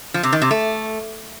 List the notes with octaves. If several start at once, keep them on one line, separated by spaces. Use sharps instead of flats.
F3
C3
D#3
C3
A3